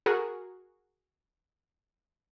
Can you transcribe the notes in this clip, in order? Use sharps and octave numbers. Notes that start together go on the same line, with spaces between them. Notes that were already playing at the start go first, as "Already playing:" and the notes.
F#4 G#4 A#4